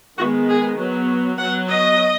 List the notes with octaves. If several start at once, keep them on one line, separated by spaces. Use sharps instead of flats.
D#3 G#3 B3 F#4
G#4
F#3 B3
F#3 B3 F#5
D#5